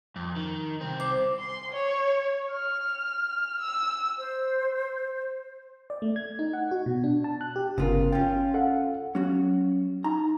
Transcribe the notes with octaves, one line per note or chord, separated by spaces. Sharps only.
F2
D#3
C2 C4
C5 D6
C6
C#5
F6
E6
C5
D5
A3
G#6
D#4
F#5
F#4
B2
D4
A5
F#6
G4
G1 C#3 B3 F4 A#4
C#4 F4 G5
A4 F5 F#5
F#3 C#4 F#4
D#4 A#5